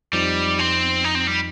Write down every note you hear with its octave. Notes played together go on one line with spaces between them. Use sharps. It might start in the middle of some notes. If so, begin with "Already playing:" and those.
F2 F3 G3 D#4
C4
D#4
C4
G3